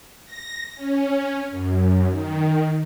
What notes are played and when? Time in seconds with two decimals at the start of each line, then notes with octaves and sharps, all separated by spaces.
0.25 A#6
0.75 C#4
1.50 F#2
2.09 D#3